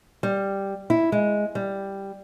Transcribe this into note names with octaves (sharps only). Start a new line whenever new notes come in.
G3
E4
G#3
G3